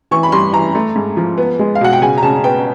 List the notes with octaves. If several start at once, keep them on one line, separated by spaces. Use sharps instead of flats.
E3 C#6
B5
G2 C6
E3 A#5
A3
G#2
F3
B3
G#3
F5
B2 F#5
G5
C#3 G#5
A#5
C#3 A5
B3 G5